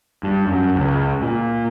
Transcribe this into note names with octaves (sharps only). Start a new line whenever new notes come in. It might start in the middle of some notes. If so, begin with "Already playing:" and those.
G2
F#2
C#2
A#2